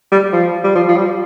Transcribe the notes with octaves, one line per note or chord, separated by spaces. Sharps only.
G3
F3
G3
F3
F3
G3